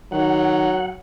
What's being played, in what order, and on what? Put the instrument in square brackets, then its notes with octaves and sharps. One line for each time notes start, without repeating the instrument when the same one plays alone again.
[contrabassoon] D#3 [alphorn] F#3 [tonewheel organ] F#5